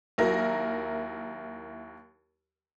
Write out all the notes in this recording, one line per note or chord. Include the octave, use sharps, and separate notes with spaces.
D#2 F#3 E4 A#4 A#6